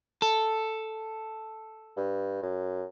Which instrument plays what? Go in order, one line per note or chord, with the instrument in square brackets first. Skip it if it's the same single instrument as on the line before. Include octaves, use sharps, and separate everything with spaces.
[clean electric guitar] A4
[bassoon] G2
F#2